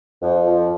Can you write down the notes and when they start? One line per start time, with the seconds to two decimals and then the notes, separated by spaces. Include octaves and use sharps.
0.22 F2
0.45 F3